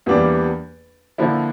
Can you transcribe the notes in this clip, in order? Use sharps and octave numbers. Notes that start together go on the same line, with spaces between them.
E2 E3 G3 A#3 D4
D3 F3 A#3 E4